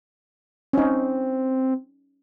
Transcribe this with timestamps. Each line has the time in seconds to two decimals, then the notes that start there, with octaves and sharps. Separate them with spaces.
0.73 C4 C#4 D#4